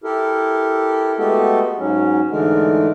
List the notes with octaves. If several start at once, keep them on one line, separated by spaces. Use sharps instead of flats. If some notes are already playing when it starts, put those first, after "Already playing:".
E4 G4 A4 A#4
G#3 A3 B3 F#4 G4 A4
G#2 F#3 C#4
G#2 D3 E3 G#3 A3 A#4